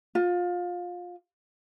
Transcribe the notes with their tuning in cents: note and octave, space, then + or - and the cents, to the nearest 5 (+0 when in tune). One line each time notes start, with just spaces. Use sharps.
F4 +20